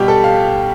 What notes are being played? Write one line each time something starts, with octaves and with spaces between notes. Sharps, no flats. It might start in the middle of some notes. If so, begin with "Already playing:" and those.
Already playing: B2 G3 G4
A4
F5